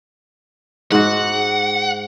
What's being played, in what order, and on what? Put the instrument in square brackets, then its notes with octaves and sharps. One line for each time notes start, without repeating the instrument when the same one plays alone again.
[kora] G#2 F#4 [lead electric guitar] F#5